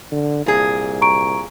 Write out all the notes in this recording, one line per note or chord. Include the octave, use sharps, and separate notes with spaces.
D3
C2 A#2 G#4
A#5 C#6 D7